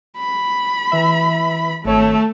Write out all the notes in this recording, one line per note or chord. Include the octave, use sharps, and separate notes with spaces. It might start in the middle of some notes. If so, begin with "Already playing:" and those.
B5
E3 E5
G#1 A3 C#5